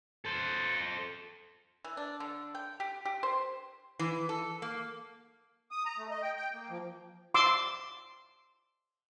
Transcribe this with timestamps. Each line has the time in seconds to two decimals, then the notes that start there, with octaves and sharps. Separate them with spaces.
0.25 A4 C5
1.85 E3
1.97 D4
2.20 D3
2.55 G5
2.80 G4
3.05 G4
3.23 C5
3.99 E3
4.29 A4
4.62 A#3
5.71 D#6
5.85 A#5
5.98 A3
6.10 D#5
6.22 G5
6.37 G5
6.53 A#3
6.70 F3
7.34 C6 D6 E6